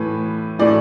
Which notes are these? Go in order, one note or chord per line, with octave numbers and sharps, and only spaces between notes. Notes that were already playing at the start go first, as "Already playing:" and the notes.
Already playing: A2 E3 A3 B4
A2 E3 A3 D5